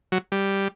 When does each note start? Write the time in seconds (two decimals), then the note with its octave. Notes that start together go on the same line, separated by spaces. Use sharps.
0.12 F#3
0.32 G3